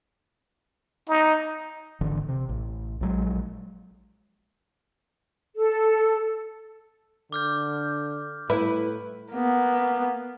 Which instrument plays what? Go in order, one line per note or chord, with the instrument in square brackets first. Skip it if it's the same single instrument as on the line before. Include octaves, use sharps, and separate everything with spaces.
[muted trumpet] D#4
[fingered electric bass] G#1 D3 E3
C3
A1
A#1 F#3 G#3
[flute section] A4
[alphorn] D3 [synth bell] D6 F6 G6
[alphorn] A2 [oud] E4 [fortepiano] B4
[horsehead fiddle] A#3 B3